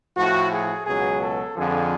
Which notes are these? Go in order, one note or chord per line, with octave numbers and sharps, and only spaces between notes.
A2 F3 F#4
G#4
C#2 B2 F#3 G#4
A4
F2 D3 F3 G#4